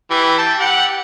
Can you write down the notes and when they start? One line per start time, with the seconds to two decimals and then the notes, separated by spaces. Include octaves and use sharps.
0.10 E3 G4
0.38 G5 A5
0.59 G4 F#5